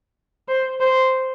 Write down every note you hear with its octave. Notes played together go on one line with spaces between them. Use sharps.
C5
C5